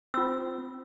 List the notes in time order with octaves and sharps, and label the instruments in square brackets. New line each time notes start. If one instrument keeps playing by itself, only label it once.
[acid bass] C4 [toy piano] F4 E6